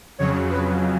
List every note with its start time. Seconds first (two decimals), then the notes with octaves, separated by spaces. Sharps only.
0.18 F2 C#3 F#3 C#5
0.50 B4